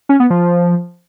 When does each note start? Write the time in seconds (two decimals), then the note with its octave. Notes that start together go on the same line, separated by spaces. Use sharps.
0.09 C#4
0.20 B3
0.30 F3